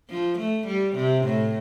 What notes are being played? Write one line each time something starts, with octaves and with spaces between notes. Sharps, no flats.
F3
A3
G3
C3
A2